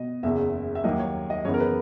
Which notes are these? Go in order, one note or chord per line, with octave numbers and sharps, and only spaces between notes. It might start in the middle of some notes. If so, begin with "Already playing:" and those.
Already playing: B2 D#5
F#1 E2 C#3 E5
E5
D#2 D#3 F#3 A#3 D#5
C#5
D#5
F#2 C#3 E3 B3 C#5
A#4
B4